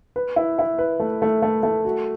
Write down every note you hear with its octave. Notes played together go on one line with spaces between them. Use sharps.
B4
E4
E4
B4
A3
A3
A3
A3
F#4